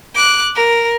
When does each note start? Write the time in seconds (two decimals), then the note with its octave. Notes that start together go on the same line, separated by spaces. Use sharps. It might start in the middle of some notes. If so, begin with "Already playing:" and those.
0.15 D6 F#6
0.55 A#4